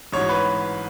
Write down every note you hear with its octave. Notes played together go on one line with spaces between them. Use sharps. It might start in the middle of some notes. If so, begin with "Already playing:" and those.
A1 G#2 F#3 C#5
B4